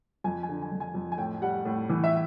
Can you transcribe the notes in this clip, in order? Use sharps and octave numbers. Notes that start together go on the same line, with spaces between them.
F2 G#5
G#5
D3
G#5
F2
G#5
F2
G#5
A2 G5
G3 F#5
A2
E3
E5